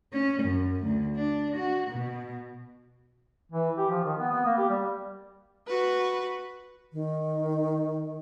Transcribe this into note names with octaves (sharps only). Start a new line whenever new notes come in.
C#4
F#2
D2
D4
F#4
B2
E3
G4
F3
D#3
B3
B3
A#3
G4
G3
F#4 B4
D#3